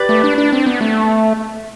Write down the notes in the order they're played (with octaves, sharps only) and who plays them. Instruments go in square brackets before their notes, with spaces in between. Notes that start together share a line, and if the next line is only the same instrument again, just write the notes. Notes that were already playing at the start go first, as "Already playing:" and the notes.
Already playing: [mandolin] G4 B4 D5
[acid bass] A3
D4
D4
C4
B3
A3